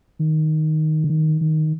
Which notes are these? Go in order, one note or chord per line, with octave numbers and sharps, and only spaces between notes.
D#3
D3
D#3
D#3